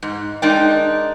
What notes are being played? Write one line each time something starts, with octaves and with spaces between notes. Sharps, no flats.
G#2
G#3 D4 D#4 A#4 D5 G5